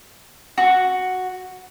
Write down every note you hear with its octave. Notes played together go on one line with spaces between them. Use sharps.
F#4